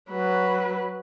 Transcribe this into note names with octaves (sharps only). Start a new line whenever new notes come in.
F#3 B4